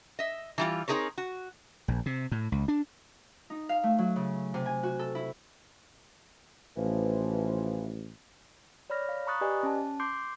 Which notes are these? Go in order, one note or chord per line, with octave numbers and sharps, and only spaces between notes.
D#5 E5
E3 G3 F4
C4 D#4 G#4 A#4 C#5
F#4
A#1
C3
A2
C#2
D4
D#4
F5
A3
F#3
C#3
C3
G#5
F#4
A4
E4
A1 E3 F3
C#5 D5 B5 F6 A#6
F5
A#5 B5 C#6 D#6 F#6 A6
G4 B4 D5 D#5 G#5
C#4 A5
C6 D6 G6 C7